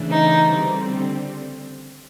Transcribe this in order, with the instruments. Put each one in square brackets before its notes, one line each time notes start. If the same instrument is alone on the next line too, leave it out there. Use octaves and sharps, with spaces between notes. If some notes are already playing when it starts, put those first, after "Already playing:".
Already playing: [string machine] C#3 E3 A3 D4
[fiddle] D#4
[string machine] D3 G3 C4